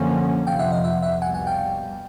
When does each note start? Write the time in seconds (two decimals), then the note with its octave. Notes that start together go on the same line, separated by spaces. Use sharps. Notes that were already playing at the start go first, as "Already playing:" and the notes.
Already playing: F#2 D3 F3 A#3 C#4 F#5 G#5
0.47 F2 C3 F3 F5 G5
0.59 E5 F#5
0.72 D#5 F5
0.84 E5 F#5
1.02 E5 F#5
1.22 C2 B2 G3 F#5 G#5
1.34 F#5 G#5
1.47 F5 G5